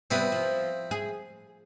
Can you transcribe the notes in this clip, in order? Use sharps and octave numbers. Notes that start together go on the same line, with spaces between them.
C3 G3 B3 C4 E4 D#6
F3
G#4